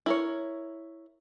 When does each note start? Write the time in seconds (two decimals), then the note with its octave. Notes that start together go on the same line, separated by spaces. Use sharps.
0.06 E4 A#4 C#5